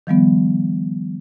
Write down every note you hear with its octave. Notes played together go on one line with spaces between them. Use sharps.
D#3 F3 G3 B3